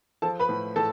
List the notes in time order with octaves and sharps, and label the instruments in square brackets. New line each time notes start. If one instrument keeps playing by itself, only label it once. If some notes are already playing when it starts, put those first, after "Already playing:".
[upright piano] F3 A4 A5
B4 B5
A2
A2 A4 A5